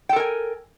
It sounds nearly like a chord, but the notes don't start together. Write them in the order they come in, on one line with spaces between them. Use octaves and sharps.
G5 A4 A#4 G#5